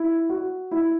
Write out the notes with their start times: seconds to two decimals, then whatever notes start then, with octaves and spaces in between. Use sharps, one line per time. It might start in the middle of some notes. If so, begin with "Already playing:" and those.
Already playing: E4
0.29 F#4
0.71 E4